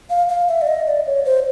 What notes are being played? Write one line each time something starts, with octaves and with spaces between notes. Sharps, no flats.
F5
F5
E5
D5
D#5
D5
C#5
C5